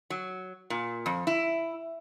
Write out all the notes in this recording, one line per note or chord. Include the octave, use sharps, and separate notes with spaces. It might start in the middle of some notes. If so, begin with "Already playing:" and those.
F#3
A#2
F2
E4